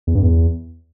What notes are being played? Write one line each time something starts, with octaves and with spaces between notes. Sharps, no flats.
E2
G2
E2